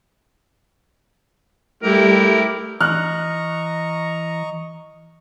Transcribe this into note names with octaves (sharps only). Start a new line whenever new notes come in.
G3 A3 E4 G4 A#4
E3 D#5 A#5 C#6 F6 F#6